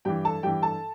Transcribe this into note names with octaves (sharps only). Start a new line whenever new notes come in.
G2 E3 G4 G5
A4 A5
G2 E3 G4 G5
A4 A5